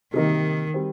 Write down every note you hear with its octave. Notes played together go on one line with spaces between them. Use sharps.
C3 D#3 G3 A#3 D#4 A#4
G3 C4